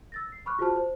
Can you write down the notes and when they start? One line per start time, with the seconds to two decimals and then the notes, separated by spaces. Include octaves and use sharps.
0.12 E6 A6 A#6
0.32 C7
0.46 B5 C#6 D6 F6 F#6
0.59 F4 F#4 G#4 C5 A5 F6
0.76 C5